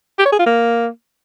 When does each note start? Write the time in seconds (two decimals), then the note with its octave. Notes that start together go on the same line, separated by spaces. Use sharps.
0.19 G4
0.25 C#5
0.32 G#4
0.39 F4
0.46 A#3